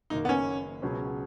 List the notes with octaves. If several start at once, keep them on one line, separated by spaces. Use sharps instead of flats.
F#1 F#2 D#3 A#3 D#4
B3
C#4
C#2 B2 F#3 C#4 G#4